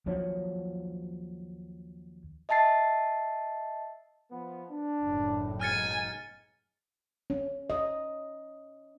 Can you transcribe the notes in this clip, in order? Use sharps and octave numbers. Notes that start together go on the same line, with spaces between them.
D#2 F3 F#3 C#4
D#5 E5 A5 A6 C7
F3 B3
D4
F#1 A2
B2 G#3 D#4 G#5 F6 A6 C#7
C#4
D#5